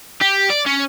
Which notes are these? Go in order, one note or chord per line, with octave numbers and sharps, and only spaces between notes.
G4
D5
C#4